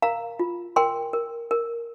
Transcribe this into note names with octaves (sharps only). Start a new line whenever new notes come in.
A#4 F5 A#5
F4
A#4 G5 C6
A#4
A#4